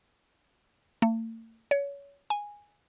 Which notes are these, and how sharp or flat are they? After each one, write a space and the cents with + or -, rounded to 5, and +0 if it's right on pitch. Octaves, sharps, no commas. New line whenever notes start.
A3 +45
C#5 +25
G#5 -10